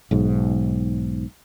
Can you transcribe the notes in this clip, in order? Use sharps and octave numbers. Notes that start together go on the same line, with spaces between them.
B1 G#2